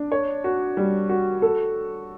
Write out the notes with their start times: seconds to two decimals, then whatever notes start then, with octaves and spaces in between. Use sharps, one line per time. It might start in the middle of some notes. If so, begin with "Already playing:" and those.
Already playing: D4
0.12 C#5
0.44 F#4
0.77 G3
1.09 F#4
1.42 A4